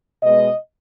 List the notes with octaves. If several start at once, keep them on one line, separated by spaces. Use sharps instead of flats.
B2 G#3 B3 D#5